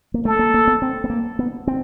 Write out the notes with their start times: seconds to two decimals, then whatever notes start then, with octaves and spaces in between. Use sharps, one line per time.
0.14 A#3
0.25 A3 A4
0.39 A#3
0.54 A#3
0.67 B3
0.82 C4
1.04 B3
1.10 A#3
1.39 B3
1.67 C4